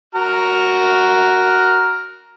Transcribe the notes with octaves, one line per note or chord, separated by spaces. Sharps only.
F#4 A#5 F6